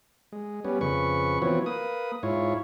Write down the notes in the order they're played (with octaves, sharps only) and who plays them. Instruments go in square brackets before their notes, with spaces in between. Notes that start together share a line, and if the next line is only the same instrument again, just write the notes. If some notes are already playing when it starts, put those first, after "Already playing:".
[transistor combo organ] G#3
G3 B3 C#4
F2 C#3 B4 C#6
E3 F3 B3 C4 F#4 C#5
A#3 B4 D#6
G#2 E4 F4 C#5